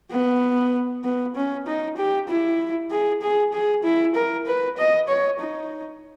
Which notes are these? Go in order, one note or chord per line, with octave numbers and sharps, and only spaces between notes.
B3
B3
C#4
D#4
G4
E4
G#4
G#4
G#4
E4
A#4
B4
D#5
C#5
D#4